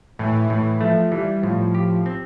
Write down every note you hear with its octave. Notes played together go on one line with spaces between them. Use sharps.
A2 E3
A2 E3
F3 A3
E3 G3
A2 F3
G4
C4